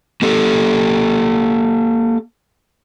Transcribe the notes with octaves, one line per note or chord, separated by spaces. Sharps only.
A#3 G4 A4